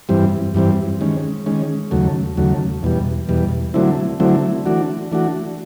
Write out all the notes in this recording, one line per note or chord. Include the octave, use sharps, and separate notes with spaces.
G2 E3 G3 C4
G2 E3 G3 C4
D#3 G#3 C#4
D#3 G#3 C#4
D#2 C#3 F#3 A3
D#2 C#3 F#3 A3
E2 B2 G3
E2 B2 G3
D3 F#3 A3 C4 E4
D3 F#3 A3 C4 E4
E3 A3 D4 F#4
E3 A3 D4 F#4